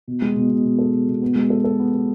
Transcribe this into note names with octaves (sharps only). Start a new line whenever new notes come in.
B2
G#3
B2
B2
B2
A4
B2
B2
B3
G#3
A4
A4
B3
B3